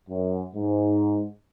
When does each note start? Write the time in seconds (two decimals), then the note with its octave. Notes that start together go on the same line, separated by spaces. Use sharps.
0.09 F#2
0.56 G#2